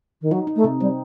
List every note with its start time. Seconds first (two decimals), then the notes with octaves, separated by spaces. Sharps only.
0.21 D#3
0.31 F#3 D#4
0.47 D#4
0.56 A3
0.64 C3
0.80 G3 C4